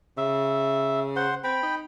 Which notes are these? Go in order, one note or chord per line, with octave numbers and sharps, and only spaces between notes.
C#3 E5
C5 F#5 C6
C4 G5 B5
D#4